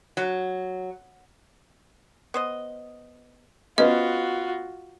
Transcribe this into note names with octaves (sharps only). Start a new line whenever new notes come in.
F#3
B3 C5 D#5
B3 C#4 F4 F#4 C5 D#5